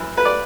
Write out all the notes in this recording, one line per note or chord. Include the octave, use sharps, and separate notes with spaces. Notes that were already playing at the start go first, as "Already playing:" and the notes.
Already playing: F#2 E3
B4
D5